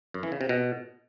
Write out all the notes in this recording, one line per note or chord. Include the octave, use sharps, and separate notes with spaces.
F#2
E3
C#3
C3
B2